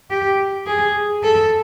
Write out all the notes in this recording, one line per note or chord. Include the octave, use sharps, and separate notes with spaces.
G4
G#4
A4